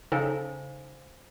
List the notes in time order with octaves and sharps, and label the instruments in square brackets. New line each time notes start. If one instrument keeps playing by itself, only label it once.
[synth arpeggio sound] C#3 D#4 A4 [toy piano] C5 F5 G#5